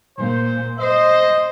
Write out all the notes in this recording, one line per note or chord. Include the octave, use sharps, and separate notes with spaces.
A#2 C5
C5 D#5